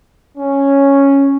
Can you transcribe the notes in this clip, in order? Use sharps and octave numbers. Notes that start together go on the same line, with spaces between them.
C#4